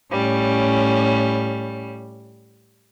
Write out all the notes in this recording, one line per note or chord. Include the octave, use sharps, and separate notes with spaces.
A2 G3 C#4